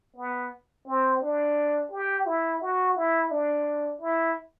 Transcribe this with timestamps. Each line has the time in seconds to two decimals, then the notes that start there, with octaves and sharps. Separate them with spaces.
0.16 B3
0.87 C4
1.22 D4
1.92 G4
2.26 E4
2.61 F#4
2.97 E4
3.31 D4
4.01 E4